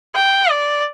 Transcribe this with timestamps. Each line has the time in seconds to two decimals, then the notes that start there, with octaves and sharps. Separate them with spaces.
0.15 G5
0.50 D5